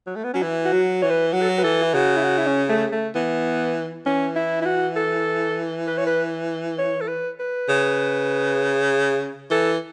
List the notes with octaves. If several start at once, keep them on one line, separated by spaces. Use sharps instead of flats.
F#3
A3
B3
F#3 C#4
E3 E4
F#4
F#3
E3 C#5
B4
F#3 F#4
A4
F#4
B4
E3 A4
E4
C#3 F#4
E4
F#4
E4
C#4
A3
A3
E3 B3
E3 C#4
E4
E4
F#4
A4
B4
C#5
B4
C#5
A4
B4
B4
C#3
E3 A4